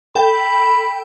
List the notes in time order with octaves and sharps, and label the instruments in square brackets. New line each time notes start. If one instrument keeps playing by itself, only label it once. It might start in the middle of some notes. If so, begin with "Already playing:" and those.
[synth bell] A4 G5 [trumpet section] B5